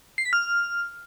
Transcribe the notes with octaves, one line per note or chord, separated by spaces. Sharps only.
C7
B6
F6